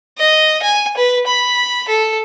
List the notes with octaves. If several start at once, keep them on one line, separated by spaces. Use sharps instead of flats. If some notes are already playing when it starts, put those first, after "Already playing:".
D#5
G#5
B4
B5
A4